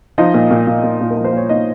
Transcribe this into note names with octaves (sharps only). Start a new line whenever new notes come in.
F3 D#4 D#5
A#2
A#2
A#2
A#2
A#2
A#4
F3
C5
A#2 C#5
A#2 D#4 D#5